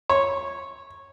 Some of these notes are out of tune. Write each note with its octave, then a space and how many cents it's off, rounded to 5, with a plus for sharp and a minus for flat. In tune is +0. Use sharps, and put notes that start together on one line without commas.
C#5 -10